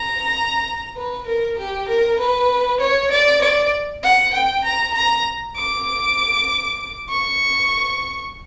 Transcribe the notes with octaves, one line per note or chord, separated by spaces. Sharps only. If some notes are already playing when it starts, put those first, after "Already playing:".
Already playing: A#5
B4
A#4
G4
A#4
B4
C#5
D5
D5
F#5
G5
A#5
A#5
D6
C#6